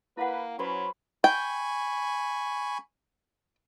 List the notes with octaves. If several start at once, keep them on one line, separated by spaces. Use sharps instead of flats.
A#3 E4 B4 F5 F#5
F#3 C#4 B4 C5 B5
G5 G#5 B5 C#6